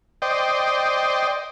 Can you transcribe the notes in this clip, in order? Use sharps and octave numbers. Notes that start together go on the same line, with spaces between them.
C5 D5 D#5 G5